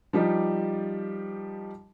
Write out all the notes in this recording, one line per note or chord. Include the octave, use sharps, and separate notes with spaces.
F3 G3 D#4 G4